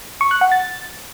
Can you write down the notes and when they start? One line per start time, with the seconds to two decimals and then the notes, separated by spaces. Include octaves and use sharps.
0.21 C#6
0.31 F#6
0.41 F#5
0.52 A6